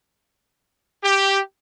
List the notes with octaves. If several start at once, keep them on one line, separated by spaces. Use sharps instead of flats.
G4